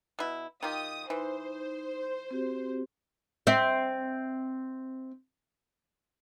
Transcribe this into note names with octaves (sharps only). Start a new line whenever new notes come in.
B2 E4
D#3 F4 G4 D#6
E3 D#4 C5
C4 F#4 G4
C4 E5